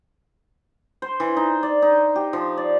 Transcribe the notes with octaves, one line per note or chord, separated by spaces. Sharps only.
C5
E3
D#4
D5
D#4
G4
F3
D5